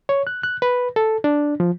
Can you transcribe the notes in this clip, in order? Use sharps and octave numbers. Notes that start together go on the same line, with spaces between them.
C#5
F#6
F#6
B4
A4
D4
F3